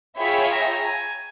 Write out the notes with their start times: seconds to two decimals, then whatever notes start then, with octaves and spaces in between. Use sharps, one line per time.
0.17 F4 G#4 C#5 E5 G5 B5
0.51 A#5
0.85 G#5